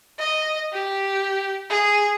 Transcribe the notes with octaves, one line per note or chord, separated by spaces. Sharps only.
D#5
G4
G#4